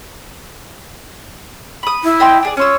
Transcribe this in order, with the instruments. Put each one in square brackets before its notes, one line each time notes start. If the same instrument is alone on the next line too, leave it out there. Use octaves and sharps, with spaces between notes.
[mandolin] B5 D#6
[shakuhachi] E4
[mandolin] D#5 G5 C6
D4 G#4 D5
[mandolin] C#4 F4 E6 [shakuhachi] C#5